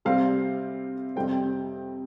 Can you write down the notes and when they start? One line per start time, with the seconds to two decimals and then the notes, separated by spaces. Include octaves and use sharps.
0.05 C3 G3 C4 F5
1.16 F2 C3 G3 C4 G5